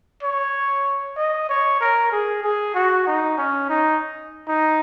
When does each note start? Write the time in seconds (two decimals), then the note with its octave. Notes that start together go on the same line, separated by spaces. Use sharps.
0.23 C#5
1.17 D#5
1.49 C#5
1.81 A#4
2.12 G#4
2.44 G#4
2.75 F#4
3.07 D#4
3.38 C#4
3.70 D#4
4.48 D#4